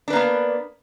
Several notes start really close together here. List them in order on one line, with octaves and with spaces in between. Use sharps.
D4 B4 A#3 B3